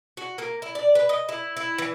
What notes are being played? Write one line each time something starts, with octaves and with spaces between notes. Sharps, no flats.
F#4
A#3
E4
D5
B4
D#5
E4
E4
E3